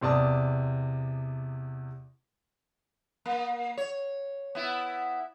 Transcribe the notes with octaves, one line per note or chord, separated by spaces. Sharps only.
E2 C3 D5 A5 D#6
A#3
C#5
B3 E4